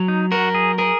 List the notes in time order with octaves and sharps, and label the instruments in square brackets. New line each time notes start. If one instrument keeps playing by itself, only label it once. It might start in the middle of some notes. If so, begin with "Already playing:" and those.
Already playing: [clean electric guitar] F#3
[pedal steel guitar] D#4
[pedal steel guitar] F#4 [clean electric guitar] A#4
[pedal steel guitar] G#4
[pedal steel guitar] G#4 [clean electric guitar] A#4